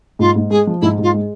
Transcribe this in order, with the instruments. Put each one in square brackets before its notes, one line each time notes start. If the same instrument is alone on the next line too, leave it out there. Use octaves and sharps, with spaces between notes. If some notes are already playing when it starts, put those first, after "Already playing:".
[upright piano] G#2 [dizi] F4
[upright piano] G#2
[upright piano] G#3 [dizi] G#4
[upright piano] F3
[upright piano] G#2 [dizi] E4
[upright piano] G#2 [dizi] F4
[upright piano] G#3